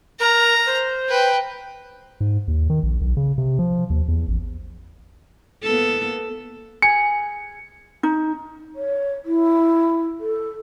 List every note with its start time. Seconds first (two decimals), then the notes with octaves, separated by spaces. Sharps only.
0.20 A#4 A#5
0.66 C5
1.09 B4 G5
2.20 G#2
2.48 D#2
2.70 D#3
2.83 A#1
3.01 B1
3.17 C#3
3.38 C3
3.59 F3
3.90 D#2
4.08 E2
4.28 A1
5.63 A#3 B3 A4
6.82 G#4 C#7
8.03 D#4
8.75 C#5
9.25 E4
10.20 A4